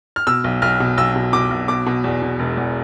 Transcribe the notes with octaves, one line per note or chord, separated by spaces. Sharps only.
F6
B2 E6
B1
B1 F6
B2
B1 E6
B2
B2 D6
B1
B2 D6
B2
E2
B2
E1
E2